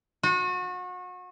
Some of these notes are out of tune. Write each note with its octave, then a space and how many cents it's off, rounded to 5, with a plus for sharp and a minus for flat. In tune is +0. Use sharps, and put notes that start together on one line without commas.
F#4 -30